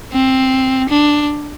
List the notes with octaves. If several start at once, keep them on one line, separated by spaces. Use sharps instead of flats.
C4
D4